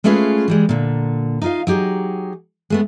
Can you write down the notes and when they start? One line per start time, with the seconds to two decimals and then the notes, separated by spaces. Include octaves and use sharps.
0.04 G#3 A3 C#4 F4 G#4 B4
0.48 E3 G3 G#3
0.69 A#2 D3
1.42 D#4 F4 F5
1.67 F#3 D#4 G4 G#4
2.70 G#3 A3 B3